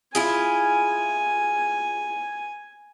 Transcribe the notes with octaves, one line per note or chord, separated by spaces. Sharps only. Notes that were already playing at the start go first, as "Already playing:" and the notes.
E4 F4 G#4 G#5